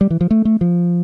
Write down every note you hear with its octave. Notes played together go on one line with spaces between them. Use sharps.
G3
E3
F3
A3
A3
F3